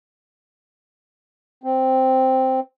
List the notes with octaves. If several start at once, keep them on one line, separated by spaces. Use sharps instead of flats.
C4